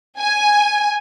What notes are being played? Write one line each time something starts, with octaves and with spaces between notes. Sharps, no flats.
G#5